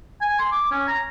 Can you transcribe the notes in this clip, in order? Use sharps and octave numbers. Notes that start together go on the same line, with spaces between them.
G#5
C6
D6
C#4
A#5